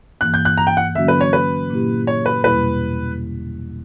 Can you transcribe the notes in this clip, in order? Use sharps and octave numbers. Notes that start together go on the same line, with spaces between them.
G2 E3 A#3 F#6
G6
F#6
A#5
G5
F#5
D3 F#3 A#3 C#4 F#4 E5
B4
C#5
B4
A#2 A#3 E4 G4
C#5
B4
E2 B2 G3 A#3 E4 B4